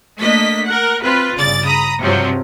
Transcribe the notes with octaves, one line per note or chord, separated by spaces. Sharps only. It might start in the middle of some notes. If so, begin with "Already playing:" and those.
A3 A#3 D4 D#5 B6
A#4 F#5
C4 F4 B4
G1 C#3 D5 A6
A#5 B5 D#6
G2 C3 F3 F#3 C4